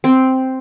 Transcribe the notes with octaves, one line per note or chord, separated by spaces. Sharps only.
C4